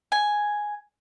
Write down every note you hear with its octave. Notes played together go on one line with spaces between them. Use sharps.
G#5